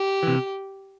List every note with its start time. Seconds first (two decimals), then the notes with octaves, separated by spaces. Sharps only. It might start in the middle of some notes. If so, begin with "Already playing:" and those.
Already playing: G4
0.23 C3 E3